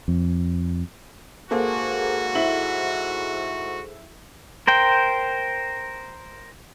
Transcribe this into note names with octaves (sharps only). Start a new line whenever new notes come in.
F2
G#2 A#3 F#4 G#4 A4 C5
E4 F#7
A#4 C5 G5